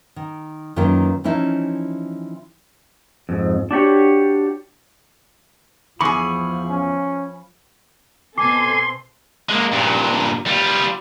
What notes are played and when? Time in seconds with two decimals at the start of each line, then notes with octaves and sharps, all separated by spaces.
0.16 D#3
0.76 F#2 D#3 E3 A#3 F4 A#4
1.24 E3 F3 C#4 D#4 E4
3.29 F2 G#2
3.71 D4 F#4 G4 C#5
6.01 E2 F3 G#4 B5 C#6
6.70 C#4
8.38 B2 C4 A4 G#5 C6 D6
9.49 G#3 A#3
9.72 G2 A#2
10.46 G3 F4